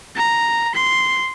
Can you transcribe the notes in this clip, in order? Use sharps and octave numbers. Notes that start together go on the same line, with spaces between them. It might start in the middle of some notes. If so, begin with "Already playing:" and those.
A#5
C6